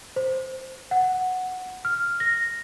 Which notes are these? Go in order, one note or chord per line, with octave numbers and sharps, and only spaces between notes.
C5
F#5
F6
A#6